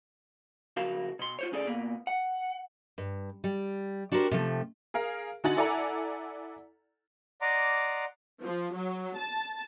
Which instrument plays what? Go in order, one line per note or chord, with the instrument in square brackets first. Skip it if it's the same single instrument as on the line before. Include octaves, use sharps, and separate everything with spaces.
[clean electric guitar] F2 C#3 F#4 A#4 F5
B2 C6
F4 C5 C#5
D2 C#4 G#4 A4 D5
A#2 A#3 B3
F#5
[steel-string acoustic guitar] G2
G3
D4 F#4 G4 A#4 C5
C3 F3 A3
[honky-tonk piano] G#4 A#4 F5
D3 D#4 F#4 G#5 A6 F#7
E4 A4 D5 F#5 G#5 A#5
[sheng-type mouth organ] D5 D#5 F#5 A#5 C6 D6
[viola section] F3
F#3
A5